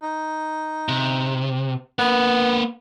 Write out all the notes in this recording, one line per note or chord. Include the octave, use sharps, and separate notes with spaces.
D#4
C3
A#3 B3 B4